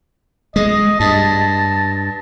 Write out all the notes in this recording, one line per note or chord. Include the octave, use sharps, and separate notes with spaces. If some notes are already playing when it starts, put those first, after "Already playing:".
G#3 D#5
G2 A5